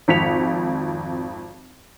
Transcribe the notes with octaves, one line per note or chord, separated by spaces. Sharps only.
G#1 F2 B6 C#7 F7